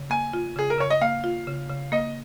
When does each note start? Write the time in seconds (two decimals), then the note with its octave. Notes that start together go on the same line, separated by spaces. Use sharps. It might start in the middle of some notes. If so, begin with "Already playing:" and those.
Already playing: C#3
0.10 A#3 G#5
0.33 F4
0.56 C#3 G#4
0.70 A#4
0.78 C#3 C#5
0.90 D#5
1.01 A#3 F5
1.24 F4
1.47 C#3
1.70 C#3
1.92 A#3 D#5